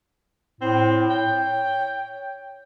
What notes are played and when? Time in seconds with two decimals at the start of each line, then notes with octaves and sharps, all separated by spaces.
0.61 A2 C4
1.10 C#5 G5